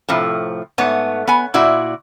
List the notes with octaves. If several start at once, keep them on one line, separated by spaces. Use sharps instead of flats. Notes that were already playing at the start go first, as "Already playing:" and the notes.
A2 C3 F3
G#2 A3 B3 C#5
B3 G#5
A#2 E4 F#4 D5